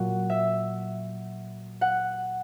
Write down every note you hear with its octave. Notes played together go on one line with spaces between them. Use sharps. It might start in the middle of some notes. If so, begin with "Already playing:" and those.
Already playing: A#2 F#3 F#5
E5
F#5